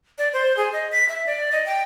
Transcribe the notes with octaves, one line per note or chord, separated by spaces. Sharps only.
D5
C5
G#4
D#5
B6
E5
D5
D#5
G5